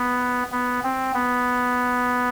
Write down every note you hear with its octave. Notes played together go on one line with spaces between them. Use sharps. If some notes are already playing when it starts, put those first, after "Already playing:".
Already playing: B3
B3
C4
B3